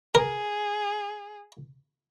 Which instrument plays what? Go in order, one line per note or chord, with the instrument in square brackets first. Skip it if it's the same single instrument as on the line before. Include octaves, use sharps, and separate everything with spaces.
[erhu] G#4 [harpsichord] A#4